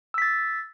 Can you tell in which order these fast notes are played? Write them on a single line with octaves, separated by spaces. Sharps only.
E6 B6 A6